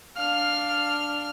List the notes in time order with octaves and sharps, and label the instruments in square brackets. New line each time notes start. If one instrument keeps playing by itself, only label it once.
[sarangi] D4 [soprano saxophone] F5 [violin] F6